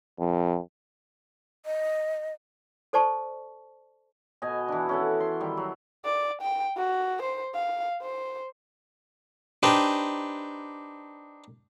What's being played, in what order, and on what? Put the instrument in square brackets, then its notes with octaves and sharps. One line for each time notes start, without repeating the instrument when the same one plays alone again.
[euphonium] F2
[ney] D#5
[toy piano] A4 C5 D5 A5 C#6
[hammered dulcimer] B2 D#5 G#5
E3 D4
C#4 A4 F#5
C6
D#3 G3
F#3
[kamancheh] D5
G5
F#4
C5
F5
C5
[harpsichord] D4 D#4 G4 B4 C5